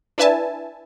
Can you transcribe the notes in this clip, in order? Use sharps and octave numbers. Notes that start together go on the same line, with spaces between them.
D4 E4 B4 E5 G#5 A5